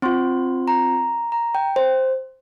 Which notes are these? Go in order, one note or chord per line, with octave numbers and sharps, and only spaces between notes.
C4 F4 C6
A#5
A#5
G5
C5